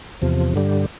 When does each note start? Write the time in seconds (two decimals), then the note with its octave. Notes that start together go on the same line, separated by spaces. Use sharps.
0.22 E2 C3 F3
0.53 G2 D3 G3